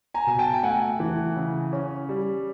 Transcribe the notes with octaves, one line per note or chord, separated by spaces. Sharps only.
G#5 A#5
B2 G#5
G5 A5
G5
A3 F#5 G#5
E3
C#3
C#4
G3